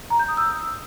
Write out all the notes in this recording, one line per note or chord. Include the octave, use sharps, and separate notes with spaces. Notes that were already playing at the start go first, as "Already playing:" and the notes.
A#5
G6
D#6
E6